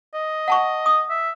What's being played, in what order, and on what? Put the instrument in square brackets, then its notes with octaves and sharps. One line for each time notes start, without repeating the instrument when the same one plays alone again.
[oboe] D#5
[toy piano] F#5 A5 C#6
D#6
[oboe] E5